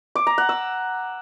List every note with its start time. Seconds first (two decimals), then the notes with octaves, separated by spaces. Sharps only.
0.15 D6
0.27 A#5
0.38 F#5
0.49 E6